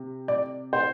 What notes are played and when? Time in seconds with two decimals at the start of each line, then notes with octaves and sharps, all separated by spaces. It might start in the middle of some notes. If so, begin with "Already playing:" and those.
Already playing: C3
0.28 D5
0.73 C5